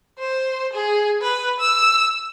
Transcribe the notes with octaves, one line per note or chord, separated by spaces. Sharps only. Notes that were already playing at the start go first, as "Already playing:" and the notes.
C5
G#4
B4
E6